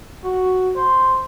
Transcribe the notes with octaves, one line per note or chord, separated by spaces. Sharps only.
F#4
C5